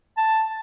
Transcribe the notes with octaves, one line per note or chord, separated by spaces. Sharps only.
A5